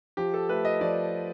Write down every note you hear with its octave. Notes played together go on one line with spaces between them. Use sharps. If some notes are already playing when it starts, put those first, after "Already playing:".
F3 G4
A4
A3 B4
D#5
F3 D5